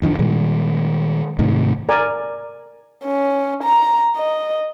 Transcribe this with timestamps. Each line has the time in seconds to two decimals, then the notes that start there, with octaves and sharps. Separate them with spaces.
0.02 F#1 D#3 F3 D4
0.19 A#2 D#3 G3 G#3
1.39 G#2 C3 D#3 A3
1.89 A#4 D5 G#5
3.05 C#4
3.63 A#5
4.17 D#5